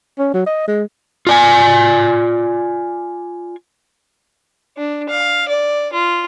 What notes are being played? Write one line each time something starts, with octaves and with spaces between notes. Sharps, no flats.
C#4
F#3
D#5
G#3
F4 D5 G#5
D4
F5
D5
F4